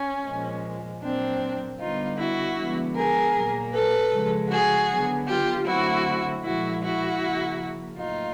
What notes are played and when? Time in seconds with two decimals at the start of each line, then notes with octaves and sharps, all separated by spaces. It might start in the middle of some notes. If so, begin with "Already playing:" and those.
Already playing: C#4
0.26 A#2 F3 G#3
1.02 A#2 F#3 A#3 C4 D4
1.79 D3 G3 B3 D#4 F4
2.19 E4 F#4
2.57 D3 F3 G#3 B3
2.95 G#4 A#4
3.35 A#2 F#3 A#3
3.73 A4 B4
4.11 C#3 F3 G#3
4.50 F#4 G#4
4.89 D3 F#3 B3
5.28 F4 G4
5.66 D3 F#3 A3 C4 E4 F#4
6.43 A#2 F3 G#3 E4 F#4
6.83 E4 F#4
7.20 C#3 F3 A#3
7.98 A2 F#3 A#3 D#4 F4